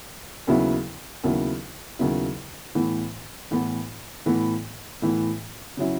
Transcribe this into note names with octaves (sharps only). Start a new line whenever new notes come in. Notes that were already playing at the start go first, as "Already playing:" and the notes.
D#2 C#3 F#3 B3 E4
D#2 C#3 F#3 B3 E4
D#2 C#3 F#3 B3 E4
A2 E3 B3
A2 E3 B3
A2 E3 B3
A2 E3 B3
C#3 F#3 C#4 E4